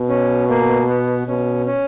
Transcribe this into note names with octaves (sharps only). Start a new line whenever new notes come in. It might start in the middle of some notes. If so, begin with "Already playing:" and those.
Already playing: B2
C#4
A#3
B3
B2 C#4
C#4